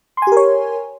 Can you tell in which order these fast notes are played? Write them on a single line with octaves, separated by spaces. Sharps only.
C6 G#5 G4 A#4 C#5